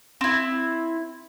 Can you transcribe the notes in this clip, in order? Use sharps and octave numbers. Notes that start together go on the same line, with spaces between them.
C4 E4